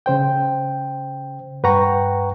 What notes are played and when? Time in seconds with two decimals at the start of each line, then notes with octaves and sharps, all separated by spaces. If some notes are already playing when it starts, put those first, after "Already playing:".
0.06 C#3 C5 G5
1.63 G2 B4 F#5 G5 A#5 C#6